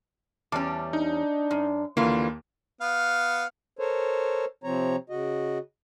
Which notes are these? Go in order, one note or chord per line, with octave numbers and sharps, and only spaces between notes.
E2 G3 C#4 A5 D6
D4 D#4
F#2
D#2 D3 E3 A#3 F4
B3 F5
A4 A#4 C5 C#5
C3 F3 C4 C#5 A#5
C#3 F#4 D#5